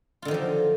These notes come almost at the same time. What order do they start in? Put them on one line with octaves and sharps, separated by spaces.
F4 D3 D#3 F3 F#3